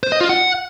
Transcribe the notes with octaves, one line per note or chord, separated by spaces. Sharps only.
C5
D#5
F4
F#5